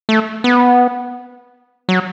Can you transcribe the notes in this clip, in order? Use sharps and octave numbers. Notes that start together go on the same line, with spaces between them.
A3
B3
F#3